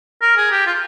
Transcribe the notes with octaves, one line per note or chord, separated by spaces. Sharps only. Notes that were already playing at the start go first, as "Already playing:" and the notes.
A#4
G#4
G4
F4